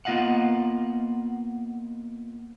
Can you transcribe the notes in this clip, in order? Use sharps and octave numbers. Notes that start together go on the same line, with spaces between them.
A#3 B3 F4 D#5 F5 F#5